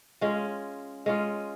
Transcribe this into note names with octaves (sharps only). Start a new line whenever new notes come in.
G#3 C#4 F4
G#3 C#4 F4